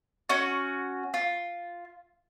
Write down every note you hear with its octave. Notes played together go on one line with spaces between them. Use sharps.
C#4 F#4
F4